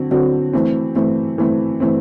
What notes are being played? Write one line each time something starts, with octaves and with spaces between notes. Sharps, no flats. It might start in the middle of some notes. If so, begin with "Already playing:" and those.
Already playing: D3 F#3 C4 F#4
D3 F#3 C4 F#4
E3 A3 C4
E3 A3 C4
E3 A3 C4
E3 A3 C4